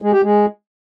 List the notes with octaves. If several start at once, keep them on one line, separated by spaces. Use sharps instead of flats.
G#3
G4
G#3